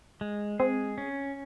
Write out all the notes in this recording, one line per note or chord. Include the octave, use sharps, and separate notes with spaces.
G#3
C4 G#4
C#4